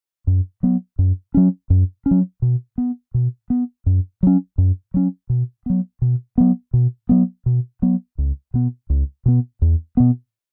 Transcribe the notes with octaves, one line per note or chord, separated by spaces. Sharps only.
F#2
F#3 B3
F#2
F#3 C#4
F#2
C#4
F#3
B2
B3
B2
B3
F#2
F#3 C#4
F#2
F#3 C#4
B2
F#3 B3
B2
F#3 B3
B2
F#3 B3
B2
F#3 B3
C#2
B2 B3
C#2
B2 B3
E2
B2 B3